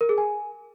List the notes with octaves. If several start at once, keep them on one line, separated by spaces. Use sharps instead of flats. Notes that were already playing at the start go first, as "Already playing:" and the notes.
A#4
G#4
G#5